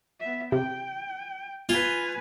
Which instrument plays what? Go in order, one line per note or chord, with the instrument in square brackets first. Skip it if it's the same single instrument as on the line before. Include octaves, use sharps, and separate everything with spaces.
[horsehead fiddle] B3 E5
[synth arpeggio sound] C3 [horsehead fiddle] G5
[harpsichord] F4 [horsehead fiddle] B4 G#5